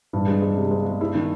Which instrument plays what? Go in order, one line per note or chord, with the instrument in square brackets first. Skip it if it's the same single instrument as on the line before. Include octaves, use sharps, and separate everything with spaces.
[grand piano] G2 [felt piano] E3
[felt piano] G#3
G#3
C3
G#3
G#3
E4
D#3